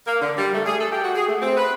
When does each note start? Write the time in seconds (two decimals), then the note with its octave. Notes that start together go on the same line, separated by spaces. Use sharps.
0.06 A#3
0.20 D3
0.36 G3
0.53 A3
0.66 G#4
0.79 A4
0.91 G4
1.03 F#4
1.14 G#4
1.27 A3
1.41 C4
1.57 B4